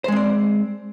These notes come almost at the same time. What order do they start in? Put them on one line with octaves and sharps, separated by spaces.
C5 G#3 C4 D5